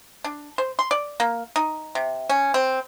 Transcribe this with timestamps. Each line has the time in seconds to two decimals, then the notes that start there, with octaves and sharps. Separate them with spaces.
0.24 D4
0.58 C5
0.79 C6
0.91 D5
1.20 A#3
1.56 D#4
1.95 C3
2.29 C#4
2.54 C4